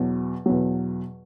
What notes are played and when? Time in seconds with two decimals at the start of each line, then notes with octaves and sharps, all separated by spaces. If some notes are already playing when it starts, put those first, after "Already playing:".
Already playing: E2 B2 F#3
0.46 E2 B2 F#3